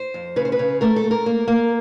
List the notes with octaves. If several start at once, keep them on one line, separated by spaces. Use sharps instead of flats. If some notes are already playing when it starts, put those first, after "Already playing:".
Already playing: C5
F2
C#3 B4
C5
B4
C#3
A3 A#4
A4
A3
A#4
A#3
A#3